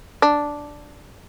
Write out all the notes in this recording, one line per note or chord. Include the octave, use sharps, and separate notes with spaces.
D4